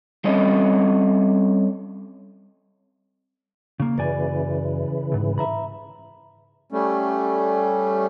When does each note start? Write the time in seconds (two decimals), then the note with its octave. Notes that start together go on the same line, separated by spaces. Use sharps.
0.24 G3 C4 C#4 A4 D5 D#5
3.80 C#3 A#3
3.98 F#2 C#3 E3 D5 G#5
5.12 C2 G#2
5.38 E5 A#5 B5
6.72 G3 A3 C#4